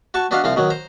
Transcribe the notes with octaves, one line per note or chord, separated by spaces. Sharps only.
F#4 A5 C#6
B3 D4 F#4 D#5 F5
C2 F3 C4 F5
B2 D#3 F#3
C5 A#5